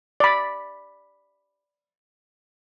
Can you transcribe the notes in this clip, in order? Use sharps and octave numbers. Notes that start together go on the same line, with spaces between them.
D5 B5